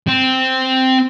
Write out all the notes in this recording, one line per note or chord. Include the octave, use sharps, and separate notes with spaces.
C4